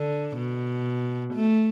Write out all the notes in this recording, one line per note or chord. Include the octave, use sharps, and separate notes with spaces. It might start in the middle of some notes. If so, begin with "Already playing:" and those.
Already playing: D3
B2
A3